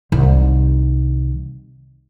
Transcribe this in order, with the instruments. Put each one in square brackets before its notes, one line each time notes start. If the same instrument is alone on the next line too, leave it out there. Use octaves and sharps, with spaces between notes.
[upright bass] C2 D#3